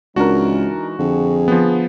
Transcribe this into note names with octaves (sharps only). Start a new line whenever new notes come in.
C#2 E3 G#3 D4 D#4 F#4 A#4
F2 D3 G#4
F3 B3